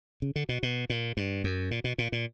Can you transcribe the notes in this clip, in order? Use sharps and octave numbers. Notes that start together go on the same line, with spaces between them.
C#3
D3
B2
B2
A#2
G2
F#2
A#2
B2
A#2
A#2